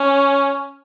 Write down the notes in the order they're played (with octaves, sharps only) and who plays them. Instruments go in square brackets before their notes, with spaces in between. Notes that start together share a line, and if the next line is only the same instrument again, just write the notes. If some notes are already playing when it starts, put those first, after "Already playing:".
Already playing: [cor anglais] C#4